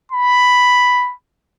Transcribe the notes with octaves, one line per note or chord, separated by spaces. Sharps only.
B5